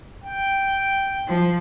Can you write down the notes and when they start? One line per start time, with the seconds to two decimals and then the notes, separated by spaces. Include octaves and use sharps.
0.24 G5
1.27 F3